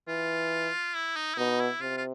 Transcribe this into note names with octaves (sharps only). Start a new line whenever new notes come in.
E3 F4
E4
D#4
E4
B2 D#4
E4
C3 F4
F4